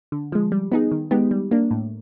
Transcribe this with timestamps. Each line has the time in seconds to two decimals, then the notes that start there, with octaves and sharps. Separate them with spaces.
0.12 D3
0.32 F3 G#3
0.52 G3
0.72 B3 D#4 G#4
0.92 D#3
1.11 G#3 B3 D#4 G4
1.31 G3
1.51 A#3 D4
1.71 A2